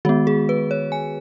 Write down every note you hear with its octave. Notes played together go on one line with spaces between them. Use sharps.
D#3 G#3 B3 F#4
G#4
B4
C#5
G#5